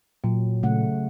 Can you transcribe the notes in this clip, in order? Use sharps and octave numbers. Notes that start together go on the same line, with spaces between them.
A#2 F#3
C#3 A3 F#5